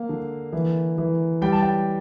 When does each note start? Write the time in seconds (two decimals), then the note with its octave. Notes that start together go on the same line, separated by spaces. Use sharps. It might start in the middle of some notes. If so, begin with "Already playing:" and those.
Already playing: A#3 F5
0.09 D3
0.53 E3
0.98 E3
1.42 G3 G5
1.52 A5
1.62 G5